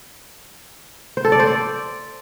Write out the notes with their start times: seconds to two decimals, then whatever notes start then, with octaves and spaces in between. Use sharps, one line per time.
1.17 C5
1.25 A4
1.32 D5
1.40 C5
1.47 D5